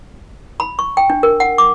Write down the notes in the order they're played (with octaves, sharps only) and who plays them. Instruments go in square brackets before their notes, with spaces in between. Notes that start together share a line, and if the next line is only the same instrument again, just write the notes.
[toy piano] B5
C#6
G5
D4
A#4
F#5
D6